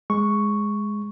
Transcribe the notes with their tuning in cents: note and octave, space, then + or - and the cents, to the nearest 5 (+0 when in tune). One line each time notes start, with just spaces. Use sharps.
G#3 +0 C#6 +0